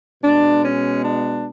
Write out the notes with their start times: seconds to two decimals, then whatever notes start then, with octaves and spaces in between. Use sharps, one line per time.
0.23 B2 G#3 B3 D4
0.63 C#4
1.04 D4